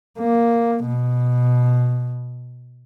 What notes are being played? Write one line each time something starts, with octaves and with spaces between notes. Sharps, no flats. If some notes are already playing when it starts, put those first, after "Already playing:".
A#3
B2